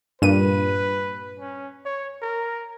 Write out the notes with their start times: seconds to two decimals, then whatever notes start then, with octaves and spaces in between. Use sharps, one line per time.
0.22 G2 A#2 B4 D#7
1.40 C#4
1.86 C#5
2.22 A#4